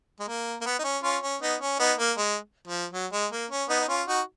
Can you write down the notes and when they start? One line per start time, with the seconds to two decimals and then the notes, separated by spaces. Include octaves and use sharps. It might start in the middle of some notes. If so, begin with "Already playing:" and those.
0.20 G#3
0.28 A#3
0.62 A#3
0.66 B3
0.79 D#4
0.84 C#4
1.03 C#4 F4
1.23 C#4
1.42 B3 D#4
1.61 C#4
1.79 B3 D#4
1.99 A#3
2.18 G#3
2.68 F3
2.93 F#3
3.13 G#3
3.32 A#3
3.51 C#4
3.69 B3 D#4
3.80 D#4
3.89 C#4 F4
4.07 D#4 F#4